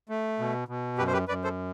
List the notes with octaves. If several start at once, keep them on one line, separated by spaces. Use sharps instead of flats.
A3
B2
B2
F#2 G4 B4
C5
G4 B4
F#2 B4 D5
A4 C5